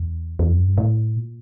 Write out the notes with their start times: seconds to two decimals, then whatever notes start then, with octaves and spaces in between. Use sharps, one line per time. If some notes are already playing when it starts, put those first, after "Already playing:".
Already playing: E2
0.39 E2
0.49 F2
0.59 F#2
0.68 G2
0.78 A2
1.16 A#2